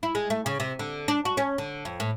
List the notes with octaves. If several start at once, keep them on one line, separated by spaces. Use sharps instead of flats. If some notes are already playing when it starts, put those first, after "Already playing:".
E4
G#3
A3
C#3
C3
D3
D4
F#4
C#4
D3
F2
A2